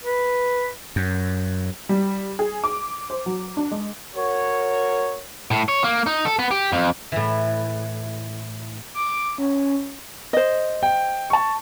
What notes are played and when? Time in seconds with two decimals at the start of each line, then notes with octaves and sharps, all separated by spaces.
0.04 B4
0.96 F#2
1.89 G3
2.39 G#4
2.64 D6
3.10 C5
3.26 F#3
3.57 D4
3.71 G#3
4.16 F#4 A#4 C#5
5.51 A2
5.69 C#5
5.84 A#3
6.06 D#4
6.25 A4
6.39 B3
6.51 G4
6.72 F2
7.12 A2 E3
8.95 D6
9.38 C#4
10.33 C5 D#5
10.83 G5
11.30 A5 C#6